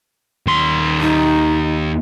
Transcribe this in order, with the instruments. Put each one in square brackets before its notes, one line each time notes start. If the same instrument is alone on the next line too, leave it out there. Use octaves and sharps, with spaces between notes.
[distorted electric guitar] D#2 C6
[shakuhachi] D#4